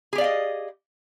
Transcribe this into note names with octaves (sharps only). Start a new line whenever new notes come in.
G4 G#4 D5 D#5 F5